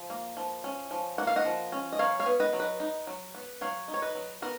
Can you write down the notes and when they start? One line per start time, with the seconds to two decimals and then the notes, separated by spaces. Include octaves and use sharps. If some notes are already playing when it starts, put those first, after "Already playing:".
Already playing: F3
0.10 A#3
0.37 F3
0.64 C#4
0.91 F3
1.18 A#3 F#5
1.27 F5
1.36 D#5 F#5
1.45 F3
1.72 C#4
1.92 D#5
1.99 F#3 C#5 F5
2.19 C#5 F5
2.26 B3
2.40 B4 D#5
2.53 F#3
2.60 B4 D#5
2.80 D#4
3.07 F#3
3.35 B3
3.61 F#3 C#5 F5
3.88 D#4
3.94 C#5
4.02 B4 D#5
4.15 F#3
4.42 B3 A#4